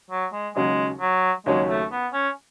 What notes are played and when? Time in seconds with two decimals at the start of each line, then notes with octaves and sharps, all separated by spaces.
0.11 F#3
0.33 G#3
0.56 D#2 C#3 F#3 G#3
1.00 F#3
1.46 D#2 C#3 F#3 G#3 C#4
1.69 A3
1.92 B3
2.13 C#4